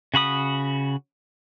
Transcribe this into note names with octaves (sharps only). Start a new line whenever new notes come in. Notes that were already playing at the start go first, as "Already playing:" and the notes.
C#3 F#4 B5 D#6